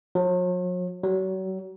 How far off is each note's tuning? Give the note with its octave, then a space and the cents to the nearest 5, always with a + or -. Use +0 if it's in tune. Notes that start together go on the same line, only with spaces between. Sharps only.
F#3 -45
F#3 +35